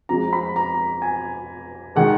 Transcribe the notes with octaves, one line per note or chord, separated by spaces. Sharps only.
F2 F3 G#3 A#5
B5
A#5
G#5
D#3 G#3 F#5